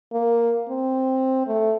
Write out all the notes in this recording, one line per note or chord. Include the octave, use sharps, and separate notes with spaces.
A#3
C4
A3